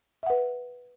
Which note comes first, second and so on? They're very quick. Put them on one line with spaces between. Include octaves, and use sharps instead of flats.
E5 F#5 B4